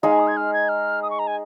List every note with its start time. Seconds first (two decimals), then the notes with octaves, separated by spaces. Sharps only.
0.03 G#3 D#4 G#4 F5
0.12 G#5
0.19 D#6
0.27 G#6
0.37 F6
0.53 G#6
0.69 F6
1.02 D#6
1.10 C#6
1.19 A#5
1.27 G#5